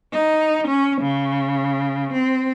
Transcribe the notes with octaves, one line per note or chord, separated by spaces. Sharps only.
D#4
C#4
C#3
C4